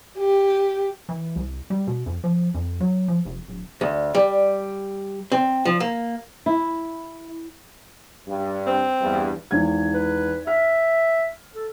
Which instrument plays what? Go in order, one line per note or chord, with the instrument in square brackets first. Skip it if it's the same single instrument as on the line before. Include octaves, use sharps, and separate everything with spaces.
[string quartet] G4
[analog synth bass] E3
C2
G3
B2
F2
F3
F2
F#3
F3
F1
D1
[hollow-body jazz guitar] D2
G3
C4
F3
A#3
[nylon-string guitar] E4
[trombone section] G2
[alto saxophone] C4
[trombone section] E2 G2
[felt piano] G#1 E2 G#6
[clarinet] B4
[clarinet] E5 [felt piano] F6
[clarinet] A4